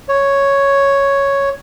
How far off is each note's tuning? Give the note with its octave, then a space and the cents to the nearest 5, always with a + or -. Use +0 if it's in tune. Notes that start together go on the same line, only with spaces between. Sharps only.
C#5 +0